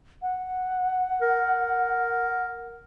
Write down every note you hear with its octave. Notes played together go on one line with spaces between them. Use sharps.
F#5
A#4